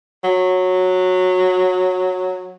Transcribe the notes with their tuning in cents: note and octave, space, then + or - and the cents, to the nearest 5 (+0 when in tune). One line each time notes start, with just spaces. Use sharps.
F#3 -10